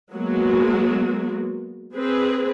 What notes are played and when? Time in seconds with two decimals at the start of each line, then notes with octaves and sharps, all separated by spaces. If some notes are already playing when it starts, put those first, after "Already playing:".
0.13 F#3 G#3 A#3 B3 F#4
1.96 C4 G#4 B4